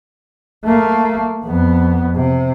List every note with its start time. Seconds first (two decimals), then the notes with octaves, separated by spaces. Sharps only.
0.65 A3 A#3
1.44 F2 B3
2.15 C3